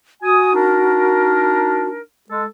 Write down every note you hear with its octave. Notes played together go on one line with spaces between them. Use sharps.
F#4 G#5 D#6
D4 D#4 A#4
G#3 A4